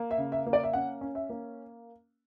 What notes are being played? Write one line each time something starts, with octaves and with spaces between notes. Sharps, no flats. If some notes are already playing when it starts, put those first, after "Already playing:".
Already playing: A#3
E5
C#3
E5
A#3
D5
E5
C#4 F#5
C#4
E5
A#3